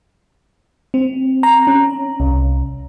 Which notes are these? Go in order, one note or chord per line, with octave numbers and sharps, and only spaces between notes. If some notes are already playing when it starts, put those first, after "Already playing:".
C4
A#5
C#4
C2